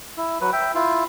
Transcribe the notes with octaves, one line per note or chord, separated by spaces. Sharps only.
E4
F#3 B4
E5 G5
E4 F4